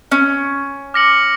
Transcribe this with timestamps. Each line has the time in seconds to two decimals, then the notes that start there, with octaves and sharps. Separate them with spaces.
0.12 C#4
0.94 D6 F6 A#6 C#7 F#7